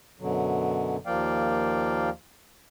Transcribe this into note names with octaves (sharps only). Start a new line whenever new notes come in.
F#2 B2 D3 F#3
D#2 F3 A#3 D5 F5 G5